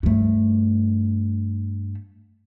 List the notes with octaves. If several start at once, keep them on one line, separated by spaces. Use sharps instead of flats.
G2 A3